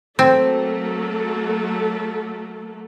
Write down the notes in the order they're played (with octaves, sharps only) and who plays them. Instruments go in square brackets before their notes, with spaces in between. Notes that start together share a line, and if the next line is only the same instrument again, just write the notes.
[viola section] F#3 A#3 A4 [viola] A3 [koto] C4